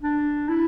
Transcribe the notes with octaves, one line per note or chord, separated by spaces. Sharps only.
D4
E4